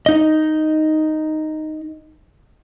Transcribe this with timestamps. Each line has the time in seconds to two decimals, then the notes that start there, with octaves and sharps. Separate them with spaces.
0.06 D#4 D#5